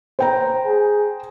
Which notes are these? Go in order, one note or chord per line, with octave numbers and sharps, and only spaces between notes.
C5 G5 A#5
G#4